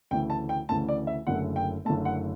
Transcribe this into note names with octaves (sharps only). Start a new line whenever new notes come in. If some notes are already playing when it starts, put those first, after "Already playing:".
D2 C#3 E3 A3 G5
A5
G5
D2 C#3 E3 A3 A5
D5
E5
F#1 F#2 D3 A3 F#5
G5
F#1 F#2 D3 A3 A5
F#5